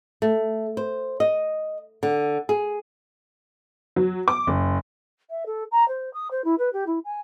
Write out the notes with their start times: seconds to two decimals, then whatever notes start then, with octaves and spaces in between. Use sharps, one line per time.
0.22 A3
0.77 C5
1.20 D#5
2.03 D3
2.49 G#4
3.96 F#3
4.28 D6
4.47 F#1
5.30 E5
5.46 A4
5.71 A#5
5.88 C5
6.13 D#6
6.31 C5
6.44 E4
6.58 B4
6.73 G4
6.86 E4
7.05 G#5